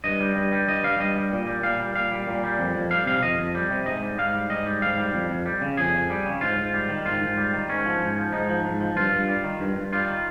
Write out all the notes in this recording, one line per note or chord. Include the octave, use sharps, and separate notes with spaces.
G2 D#5
G3
G2
G3
G2 D#5
G3 F5
G2 D#5
G3
A#2
G3
A#2 F5
G3
A#2 F5
G3
A#2
G3
F2
F2
G3 F5
C3 F5
F2 D#5
F2
G3
C3
G#2 D#5
G3
G#2 F5
G3
G#2 D#5
G3
G#2 F5
G3
F2
F2
G3
C#3
F2 G#4
F2
G3
C#3
G#2 F4
G#2
G3
D#3
G#2 F4
G#2
G3
D#3
G#2 C#4
F3
G#2
F3
G#2 D#4
F3
G#2
F3
G2 F4
G2
G3
D#3
G2
G2
G3 F4
D#3